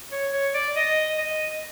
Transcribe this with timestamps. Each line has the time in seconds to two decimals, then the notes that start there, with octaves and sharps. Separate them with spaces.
0.12 C#5
0.33 C#5
0.54 D5
0.76 D#5
1.18 D#5